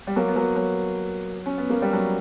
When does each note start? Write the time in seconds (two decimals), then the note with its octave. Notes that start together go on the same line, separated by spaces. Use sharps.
0.07 G3
0.16 F#3 A#3
0.28 B3
0.36 F#3 A#3
0.56 F#3
1.46 C#4
1.58 B3
1.70 A#3
1.82 G3
1.93 F#3